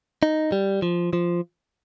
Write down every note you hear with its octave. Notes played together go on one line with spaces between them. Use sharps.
D#4
G3
F3
F3